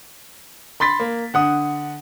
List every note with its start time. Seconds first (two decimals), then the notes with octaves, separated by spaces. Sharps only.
0.80 B5 C6 A6 B6
1.00 A#3
1.34 D3 F#5 D#6